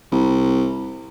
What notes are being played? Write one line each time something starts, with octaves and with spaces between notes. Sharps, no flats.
C2